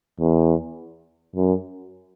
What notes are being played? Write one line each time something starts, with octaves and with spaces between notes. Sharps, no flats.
E2
F#2